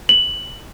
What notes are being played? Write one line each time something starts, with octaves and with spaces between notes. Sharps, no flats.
F#7